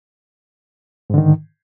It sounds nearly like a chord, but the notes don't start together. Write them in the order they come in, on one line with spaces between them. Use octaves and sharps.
G#2 D3 D#3